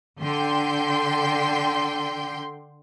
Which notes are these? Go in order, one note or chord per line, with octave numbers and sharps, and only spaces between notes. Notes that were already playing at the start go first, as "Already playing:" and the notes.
D3 G5 C6 G6